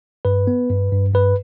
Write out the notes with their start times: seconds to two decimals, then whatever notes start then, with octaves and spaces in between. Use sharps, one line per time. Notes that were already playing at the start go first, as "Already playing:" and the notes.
0.25 G2 B4
0.47 B3
0.70 G2
0.92 G2
1.14 G2 B4